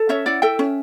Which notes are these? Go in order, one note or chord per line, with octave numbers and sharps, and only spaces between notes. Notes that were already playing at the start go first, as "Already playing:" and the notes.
Already playing: A4
C#4 C#5 E5
E4 D5 F#5
A4 E5 G5
C#4